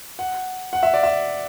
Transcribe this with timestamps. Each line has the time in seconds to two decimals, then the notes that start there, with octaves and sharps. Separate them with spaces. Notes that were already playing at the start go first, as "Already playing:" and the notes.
0.19 F#5
0.73 F#5
0.83 E5
0.94 D5
1.03 E5